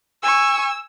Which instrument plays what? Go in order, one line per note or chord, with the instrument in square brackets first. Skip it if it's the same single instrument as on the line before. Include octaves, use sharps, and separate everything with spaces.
[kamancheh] G#5 C#6 [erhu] E6